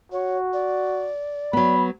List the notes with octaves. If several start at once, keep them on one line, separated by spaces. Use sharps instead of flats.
F#4 C#5
D5
F#3 B3 B5